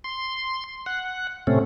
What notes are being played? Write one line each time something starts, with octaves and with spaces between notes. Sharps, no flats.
C6
F#5
A2 C3 A3 C4 C#4